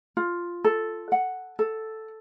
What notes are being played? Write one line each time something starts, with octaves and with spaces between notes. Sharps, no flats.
F4
A4
F#5
A4